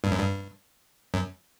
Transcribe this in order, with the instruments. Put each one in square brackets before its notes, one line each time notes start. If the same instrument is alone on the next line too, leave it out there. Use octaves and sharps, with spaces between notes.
[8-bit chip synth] G2
F#2
G2
F#2